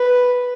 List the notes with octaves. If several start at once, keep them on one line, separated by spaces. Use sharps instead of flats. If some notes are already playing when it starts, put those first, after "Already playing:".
Already playing: B4